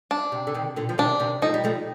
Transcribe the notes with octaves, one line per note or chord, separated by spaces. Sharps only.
D4
C3
D3
C3 D#3
A#2 D3
F3
C3 D#3 D4
C3 D#3
F3 A3 D#4
G3
F3 A3